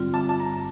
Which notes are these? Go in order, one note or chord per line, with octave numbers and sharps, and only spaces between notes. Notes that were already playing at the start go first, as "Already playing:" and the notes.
Already playing: G2 D3 G3 C4 F4
A5
A5
A#5